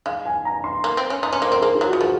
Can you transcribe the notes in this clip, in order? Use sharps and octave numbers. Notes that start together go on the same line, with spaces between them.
G#3 F5
G#5
A#5
C6
A#3
C4
C#4
D#4 C6
C#4 A#5
A#3 C5
C4 A#4
A#3 G#4
F4
F#3
F#4
D#3
F3 G#4